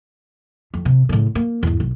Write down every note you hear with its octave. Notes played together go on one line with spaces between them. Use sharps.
F2
C3
A2 C#3
A#3
E2 G#2
B1